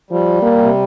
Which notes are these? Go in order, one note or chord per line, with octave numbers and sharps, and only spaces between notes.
F3 G3
A#3
C3